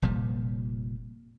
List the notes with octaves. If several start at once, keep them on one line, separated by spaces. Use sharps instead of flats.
F1 A#2 F3 G3